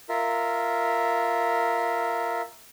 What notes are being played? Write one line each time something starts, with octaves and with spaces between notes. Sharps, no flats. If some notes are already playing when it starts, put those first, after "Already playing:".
F4 A#4 E5